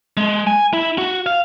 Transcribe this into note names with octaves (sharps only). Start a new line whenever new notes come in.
G#3
G#5
E4
F#4
F5